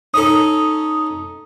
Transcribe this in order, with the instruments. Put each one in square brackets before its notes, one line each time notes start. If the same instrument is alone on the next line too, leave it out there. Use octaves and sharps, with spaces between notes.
[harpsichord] C#4 D#4 A4 [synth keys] D#6